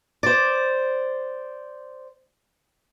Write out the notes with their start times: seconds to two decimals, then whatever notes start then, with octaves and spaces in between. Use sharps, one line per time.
0.23 C5 D5